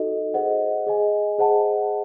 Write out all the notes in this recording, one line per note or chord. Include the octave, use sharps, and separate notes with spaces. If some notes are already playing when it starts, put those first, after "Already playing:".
Already playing: D#4 F#4 A4 D#5
G#4 C5 D#5 F#5
G#4 D#5 G#5
G#4 C5 D#5 F#5 A5